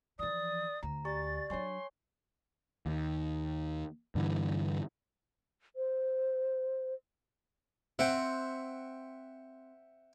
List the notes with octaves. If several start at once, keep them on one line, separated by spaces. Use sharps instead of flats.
E3 F3 D5 D#6
D2 A#5
G4 D5 G#5 C#6 A6
F#3 D4 C#5 G#5 C6 C#6
D#2
G2 D3 E3
C5
C4 E5 F#5 G5